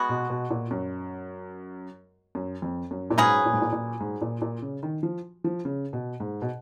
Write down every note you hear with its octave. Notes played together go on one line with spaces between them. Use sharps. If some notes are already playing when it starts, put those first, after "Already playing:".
Already playing: G#3 B3 F#4
B2
B2
A#2
F#2
F#2
F2
F#2
A#2
G#2 F#3 C#4 G#4 B4
A#2
G#2
A#2
A#2
G#2
A#2
A#2
C#3
D#3
F3
F3
C#3
B2
G#2
B2